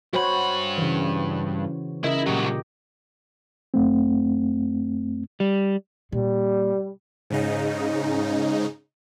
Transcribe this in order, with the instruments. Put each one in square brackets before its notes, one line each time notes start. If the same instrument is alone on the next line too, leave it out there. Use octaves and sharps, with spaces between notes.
[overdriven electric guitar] G2 B5 [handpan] F#4 C5 C#5
[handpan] C#3 E3
[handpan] C#3 A#4 D#5 [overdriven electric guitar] E4 E5
[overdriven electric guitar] C2 F#3 [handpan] A#2 G4
[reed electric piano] F#2 A3 C4
[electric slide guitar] G3
[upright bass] A#2 [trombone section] G3
[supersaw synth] G#2 C#3 D#4